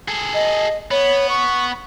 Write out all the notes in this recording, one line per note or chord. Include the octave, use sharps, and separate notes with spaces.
G#4 A4
D#5
B3 C#5
C#6